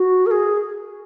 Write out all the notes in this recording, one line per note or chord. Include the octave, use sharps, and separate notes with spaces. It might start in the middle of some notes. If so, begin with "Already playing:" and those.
Already playing: F#4
A#4
G#4